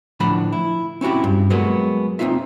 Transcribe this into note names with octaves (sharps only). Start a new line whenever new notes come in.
A2 D3 F3 D4 F#5 B5
E4
C4 C#4 E4 F#4 G4
G2
F#3 G#3 A#3 B3 F#4
C4 C#4 D#4 F4 E5